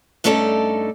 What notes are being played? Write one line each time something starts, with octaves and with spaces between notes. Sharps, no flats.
G2 A3 C#4 D#4 A4 D5